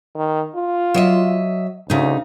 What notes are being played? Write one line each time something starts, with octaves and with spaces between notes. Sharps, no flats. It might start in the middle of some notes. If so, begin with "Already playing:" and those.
D#3
F4
F#3 D#5 E5
D2 C#3 D#4